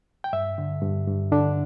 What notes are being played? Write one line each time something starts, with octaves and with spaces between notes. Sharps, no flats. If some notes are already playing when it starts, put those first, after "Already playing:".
G5
G2 E5
D3
G2
G2
D3 D4